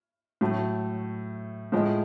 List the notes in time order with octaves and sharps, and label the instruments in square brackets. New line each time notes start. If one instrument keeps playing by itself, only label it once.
[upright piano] A2 F#3 A3
A2 F3 G#3